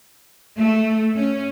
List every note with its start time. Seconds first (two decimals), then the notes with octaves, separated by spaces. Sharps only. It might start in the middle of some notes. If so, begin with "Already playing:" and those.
0.58 A3
1.15 C#4